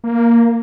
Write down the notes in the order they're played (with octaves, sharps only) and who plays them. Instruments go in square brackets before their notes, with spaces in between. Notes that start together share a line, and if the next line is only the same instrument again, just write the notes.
[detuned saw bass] A#3